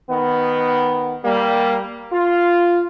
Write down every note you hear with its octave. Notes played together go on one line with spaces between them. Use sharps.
D#3 B3
G3 A#3
F4